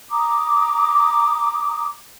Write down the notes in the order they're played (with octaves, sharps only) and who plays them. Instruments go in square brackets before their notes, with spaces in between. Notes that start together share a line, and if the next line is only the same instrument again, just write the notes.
[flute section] A#5 D6 D#6